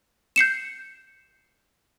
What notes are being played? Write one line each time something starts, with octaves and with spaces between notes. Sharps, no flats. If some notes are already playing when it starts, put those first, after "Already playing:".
G6 C7 C#7 E7